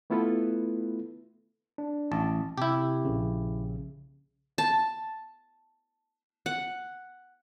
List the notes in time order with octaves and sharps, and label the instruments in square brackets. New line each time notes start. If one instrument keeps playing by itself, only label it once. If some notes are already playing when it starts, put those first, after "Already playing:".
[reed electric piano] A3 B3 E4 F4 A4 B4
[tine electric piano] D4
[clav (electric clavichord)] A1 [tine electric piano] A5
[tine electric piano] C3 [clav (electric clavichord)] E4 G4
[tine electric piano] A#1 C#3
[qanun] A5
F#5